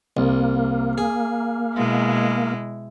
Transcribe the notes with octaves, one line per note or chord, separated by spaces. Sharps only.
C2 A#3
G#4
B2 G#3 E4